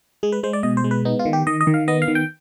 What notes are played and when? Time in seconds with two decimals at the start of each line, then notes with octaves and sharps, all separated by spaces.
0.23 G#3 G#4
0.32 B4
0.43 G#3 C5
0.53 D5
0.63 B2 D#5
0.77 C5
0.84 G#3
0.91 B4
1.05 B3 D#4
1.19 F4
1.25 D#3
1.33 G4
1.47 D#3 D#5
1.61 D#5
1.67 D#3
1.74 F5
1.88 B3 D#5
2.02 F5
2.08 D#3
2.15 G5